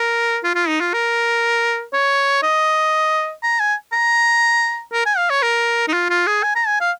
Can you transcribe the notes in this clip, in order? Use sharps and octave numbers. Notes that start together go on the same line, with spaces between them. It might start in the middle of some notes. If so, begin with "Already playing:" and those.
Already playing: A#4
F4
F4
D#4
F4
A#4
C#5
D#5
A#5
G#5
A#5
A#4
G#5
F5
C#5
A#4
D#4
F4
F4
G#4
G#5
A#5
G#5
F5